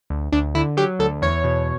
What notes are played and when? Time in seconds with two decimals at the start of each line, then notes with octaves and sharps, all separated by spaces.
0.10 D2
0.32 D2 D4
0.55 D3 E4
0.77 F#3 G4
0.99 D2 A4
1.22 E2 C#5
1.44 B2